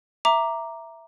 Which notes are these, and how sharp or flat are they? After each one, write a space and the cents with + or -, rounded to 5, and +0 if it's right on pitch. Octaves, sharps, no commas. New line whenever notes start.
E5 +5 A#5 +0 D6 +0